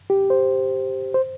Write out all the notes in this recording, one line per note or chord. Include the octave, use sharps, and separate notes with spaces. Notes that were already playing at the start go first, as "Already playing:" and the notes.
G4
C5
C5